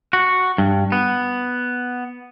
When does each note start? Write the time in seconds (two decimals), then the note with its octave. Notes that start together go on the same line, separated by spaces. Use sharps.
0.13 F#4
0.58 G2
0.92 B3